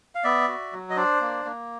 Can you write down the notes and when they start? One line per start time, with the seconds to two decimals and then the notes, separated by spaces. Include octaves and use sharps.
0.15 F5
0.24 B3 D5 E5
0.48 F#4
0.73 F#3
0.90 D#5
0.96 D4 C5 D5
1.21 A#3
1.45 A#3